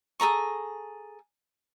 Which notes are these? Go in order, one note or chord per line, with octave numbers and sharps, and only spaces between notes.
G#4 A4 A#5 C#6